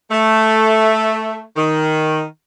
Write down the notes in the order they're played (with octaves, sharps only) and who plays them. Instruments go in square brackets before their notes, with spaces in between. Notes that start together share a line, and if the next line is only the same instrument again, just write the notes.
[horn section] A3
D#3